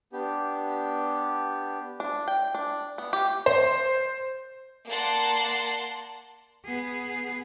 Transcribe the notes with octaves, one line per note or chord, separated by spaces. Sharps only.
B3 D4 G4
D4
G5
D4
B3
G4
C5
A#3 D5 F#5 A5 C6
B3 G#4